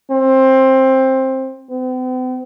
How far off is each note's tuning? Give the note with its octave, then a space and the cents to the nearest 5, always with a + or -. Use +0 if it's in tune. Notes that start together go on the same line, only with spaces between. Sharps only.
C4 +15
C4 -45